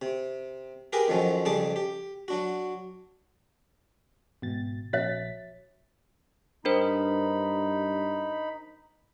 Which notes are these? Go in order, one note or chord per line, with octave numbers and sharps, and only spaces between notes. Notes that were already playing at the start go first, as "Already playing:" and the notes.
C3
G4 G#4 A#4 B4 G5 G#5
F2 D#3 F3 F#3 C#4
F2 C#3 G3 G#4 A5 D6
G4
F#3 D4 F#4
G#1 B2 A6
A#1 F#4 C#5 E5 A6 B6
G2 D4 D#4 A#4 C5 B5